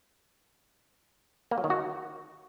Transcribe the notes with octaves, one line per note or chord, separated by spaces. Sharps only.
A#3
F#3
D#3
F#4